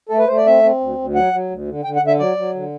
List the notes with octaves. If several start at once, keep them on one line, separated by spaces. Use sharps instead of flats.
A3 A4
B4
A3 C5
D5
C4 E5
C4
D2
D2
F#3 F#5
F#3
D2
D3
D3 G5
F#5
D3
E5
F#3 D5
F#3
D3